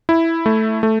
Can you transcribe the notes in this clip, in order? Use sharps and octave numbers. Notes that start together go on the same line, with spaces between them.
E4
A3
A3